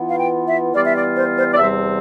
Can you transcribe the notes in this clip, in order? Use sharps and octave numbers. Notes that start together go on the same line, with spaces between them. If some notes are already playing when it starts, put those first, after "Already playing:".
Already playing: E3 B3 F4
F5
G5
E5
E3 G3 B3 F4 D5
E5
D5
C5
C5
D5
E2 C3 G3 C4 E5